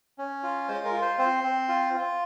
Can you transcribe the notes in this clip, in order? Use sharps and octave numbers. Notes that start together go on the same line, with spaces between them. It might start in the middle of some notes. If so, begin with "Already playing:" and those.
C#4
F4
G#3 C5
A#4
F4
C5
C4 C5
C4
F4
F4